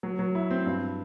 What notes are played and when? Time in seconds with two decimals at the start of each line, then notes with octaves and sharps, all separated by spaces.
0.03 F#3
0.19 F#3
0.35 E4
0.51 C4
0.66 G2